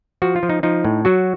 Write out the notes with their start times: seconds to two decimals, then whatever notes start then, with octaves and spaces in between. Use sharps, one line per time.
0.22 F3 F#4
0.36 F4
0.43 F3
0.49 D#4
0.63 F3 D#4
0.85 A2
1.05 F#3 F#4